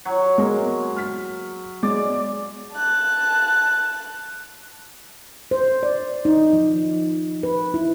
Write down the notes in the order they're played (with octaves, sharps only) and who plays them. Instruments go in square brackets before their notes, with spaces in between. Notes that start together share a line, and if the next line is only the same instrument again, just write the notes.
[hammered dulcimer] F#3
[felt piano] G#3 A#3 A#4
F6 B6
[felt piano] G#3 [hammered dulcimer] D5
[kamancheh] A5 F#6
[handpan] C5
D5
D#4
F3
B4
E4